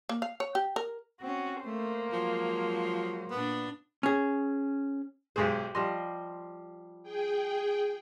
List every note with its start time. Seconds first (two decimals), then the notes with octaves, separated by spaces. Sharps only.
0.09 A#3
0.22 F5
0.40 C#5
0.55 G4
0.76 A#4
1.21 C4 C#4 F#4
1.65 A3 A#3 C5
2.12 F3 F#3 G#3
3.31 A#2 B3 D4
4.03 C#4 G#4
5.36 B1 G#2 G4 G#4 C5
5.75 F3 G3 D#5 C6
7.03 G#4 G5